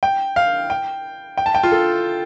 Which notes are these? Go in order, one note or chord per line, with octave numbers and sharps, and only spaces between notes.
G5
F5
G5
G5
A5
G5
F4
A4